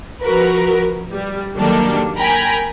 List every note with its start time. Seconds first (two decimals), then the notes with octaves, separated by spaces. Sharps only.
0.21 F3 F#4 A#4 B4
1.11 G3
1.55 D#3 F#3 G3 A#3 D4 A4
2.17 A#4 G5 G#5 A#5 B5